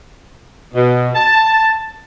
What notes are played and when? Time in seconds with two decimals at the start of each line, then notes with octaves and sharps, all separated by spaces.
0.75 B2
1.15 A5